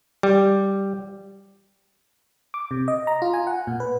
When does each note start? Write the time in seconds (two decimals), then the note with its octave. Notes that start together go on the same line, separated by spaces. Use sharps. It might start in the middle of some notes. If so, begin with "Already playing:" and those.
0.23 G3
2.54 D6
2.71 C3
2.88 D#5
3.07 A#5
3.22 F4
3.34 G#5
3.47 F#5
3.67 A#2
3.80 B4